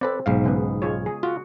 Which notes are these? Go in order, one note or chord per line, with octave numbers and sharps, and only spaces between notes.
C4 A4 B4 D5
B1 G#2 F5
C#3 G#3 B3
G#3 F4 C#5
G#4
F4 F#4